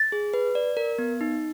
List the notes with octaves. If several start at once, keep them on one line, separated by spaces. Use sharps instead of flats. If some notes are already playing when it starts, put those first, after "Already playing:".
Already playing: A6
G#4
B4
D5
A#4
B3
D#4